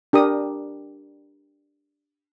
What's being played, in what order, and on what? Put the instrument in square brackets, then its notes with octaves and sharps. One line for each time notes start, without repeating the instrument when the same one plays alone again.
[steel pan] D4 G4 A#4 D#6